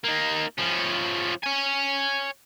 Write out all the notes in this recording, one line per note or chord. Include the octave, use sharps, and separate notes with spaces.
A#3 D#4
F3 C#4
C#5 G#5